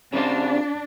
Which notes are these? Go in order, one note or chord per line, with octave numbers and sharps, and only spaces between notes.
C#3 C4 D4 F4